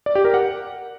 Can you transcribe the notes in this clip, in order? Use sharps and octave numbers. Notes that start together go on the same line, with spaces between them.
D5
G4
A#4
F#5